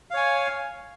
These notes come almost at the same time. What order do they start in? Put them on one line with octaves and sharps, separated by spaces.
F5 C#5 G#5